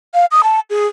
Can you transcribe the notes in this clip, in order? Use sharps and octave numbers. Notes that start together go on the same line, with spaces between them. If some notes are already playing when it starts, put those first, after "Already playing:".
F5
D#6
A5
G#4